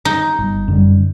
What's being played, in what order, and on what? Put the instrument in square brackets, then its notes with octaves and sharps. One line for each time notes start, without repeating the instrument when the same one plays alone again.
[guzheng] D#4
[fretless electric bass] G1
F#2 D3 G3